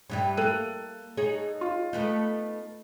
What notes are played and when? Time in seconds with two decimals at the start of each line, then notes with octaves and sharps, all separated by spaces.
0.10 G2 E3 G3
0.37 A#3 A4 F#6 D#7
1.17 D#4 G#4 C#5
1.61 F4
1.93 A3 B3 D#4